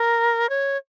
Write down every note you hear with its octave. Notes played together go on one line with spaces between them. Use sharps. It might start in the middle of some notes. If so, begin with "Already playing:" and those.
Already playing: A#4
C#5